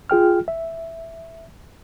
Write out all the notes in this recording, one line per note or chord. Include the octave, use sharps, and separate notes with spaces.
F4 G#4 G5 F6
E5